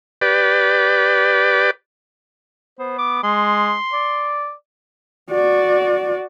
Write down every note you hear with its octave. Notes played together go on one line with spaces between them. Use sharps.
G4 B4 D5
B3 C5
D6
G#3 C6
D5
F#4 D5